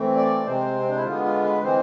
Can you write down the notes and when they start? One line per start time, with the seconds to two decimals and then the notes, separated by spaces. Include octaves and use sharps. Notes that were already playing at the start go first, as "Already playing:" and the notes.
Already playing: E3 A3 C4
0.16 D5
0.46 C3 G#3 C4 C5
0.80 C4
0.88 D4
0.96 E4
1.05 D3 G#3 B3 F4
1.24 F4
1.43 B4
1.63 E3 G#3 C4 C5